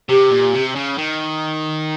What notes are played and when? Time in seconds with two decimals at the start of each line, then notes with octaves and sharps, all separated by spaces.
0.09 C3 G4
0.31 A#2
0.53 C3
0.75 C#3
0.98 D#3